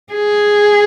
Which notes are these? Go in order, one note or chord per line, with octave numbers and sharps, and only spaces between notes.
G#4